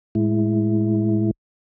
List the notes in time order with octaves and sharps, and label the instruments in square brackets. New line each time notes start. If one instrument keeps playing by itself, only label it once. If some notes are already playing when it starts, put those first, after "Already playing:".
[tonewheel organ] A2 G#3 E4